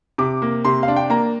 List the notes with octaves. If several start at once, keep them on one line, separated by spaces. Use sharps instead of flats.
C3 D6
A#3
C3 C6
F5
D4
G5
A#3 A#5